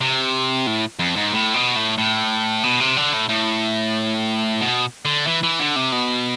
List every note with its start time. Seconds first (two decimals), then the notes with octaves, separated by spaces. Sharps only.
0.01 C3
0.67 A2
0.99 F2
1.16 G#2
1.32 A2
1.54 B2
1.76 A2
1.98 A2
2.63 B2
2.80 C3
2.97 D3
3.13 A2
3.29 A2
4.61 B2
5.05 D3
5.27 E3
5.43 E3
5.60 D3
5.76 C3
5.92 B2